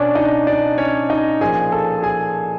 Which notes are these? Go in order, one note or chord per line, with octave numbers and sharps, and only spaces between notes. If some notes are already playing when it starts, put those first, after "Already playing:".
Already playing: B2 C#4 D4 C#5 D5
D#4 D#5
D4 D5
C#4 C#5
D#4 D#5
A#2 F3 G#4 G#5
A4 A5
G#4 G#5